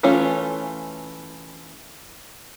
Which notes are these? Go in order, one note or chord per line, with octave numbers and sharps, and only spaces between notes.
E3 A3 C#4 F4